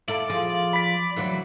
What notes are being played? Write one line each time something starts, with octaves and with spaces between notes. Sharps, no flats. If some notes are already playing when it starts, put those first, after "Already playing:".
E4 A4 D5
F3 G#4
B5 B6
D2 E3 F#3